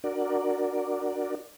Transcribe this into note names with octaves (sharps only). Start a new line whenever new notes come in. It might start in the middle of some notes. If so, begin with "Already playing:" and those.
D4 F#4 A#4 D5